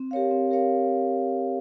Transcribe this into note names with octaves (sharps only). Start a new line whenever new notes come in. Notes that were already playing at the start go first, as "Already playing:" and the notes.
Already playing: C4
G4 A#4 C#5 F5
C4
G4 A#4 C#5 F5